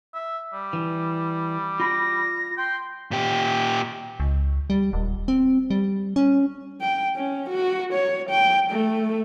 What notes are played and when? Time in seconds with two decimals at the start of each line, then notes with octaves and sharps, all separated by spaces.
0.14 E5
0.53 G3
0.73 E3
1.80 F4 B5 A#6
2.58 G5 C6
3.11 A#2 G4
4.20 C#2
4.70 G3
4.93 D#1
5.28 C4
5.70 G3
6.16 C#4
6.81 G5
7.16 C#4
7.50 F#4
7.94 C#5
8.30 G5
8.71 A3